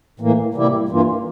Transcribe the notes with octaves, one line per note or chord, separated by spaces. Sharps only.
A2 E3 A#3
C3 G3 A#3 E4 G4
G2 E3 A#3 F4